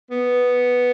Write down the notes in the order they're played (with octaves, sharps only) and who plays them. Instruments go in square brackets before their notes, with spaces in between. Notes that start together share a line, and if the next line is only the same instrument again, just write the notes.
[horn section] B3